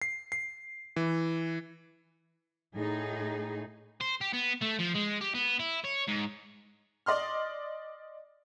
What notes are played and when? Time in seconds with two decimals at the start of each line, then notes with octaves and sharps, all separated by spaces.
0.02 C7
0.32 C7
0.96 E3
2.76 A2 D#4 G#4
4.01 C5
4.21 G4
4.34 B3
4.62 A3
4.80 F3
4.95 G#3
5.21 G4
5.35 B3
5.59 E4
5.84 C#5
6.08 G#2
7.06 D5 D#5 C6 F6